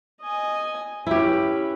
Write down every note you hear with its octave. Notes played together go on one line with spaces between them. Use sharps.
D#5 G#5
C#4 E4 G4 B4